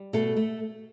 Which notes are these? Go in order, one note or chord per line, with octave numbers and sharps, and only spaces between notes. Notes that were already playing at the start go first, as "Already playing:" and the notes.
Already playing: G3
B2 A3 A4
A3